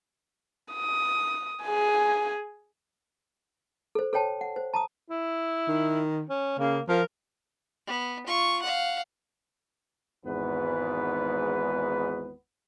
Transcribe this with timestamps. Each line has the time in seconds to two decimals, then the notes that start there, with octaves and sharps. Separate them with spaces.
0.74 D#6
1.64 G#4 G#5
3.95 A4 C5
4.13 A4 C5 C#5 G5 A5
4.41 F#5
4.56 C5
4.74 A5 A#5 D#6
5.10 E4
5.68 D#3
6.29 C#4
6.59 C#3 A#3
6.89 F3 A#4
7.87 B3
8.26 F4 C#6
8.62 F5 F#5
10.24 G#1 E2 G#2 B3 B4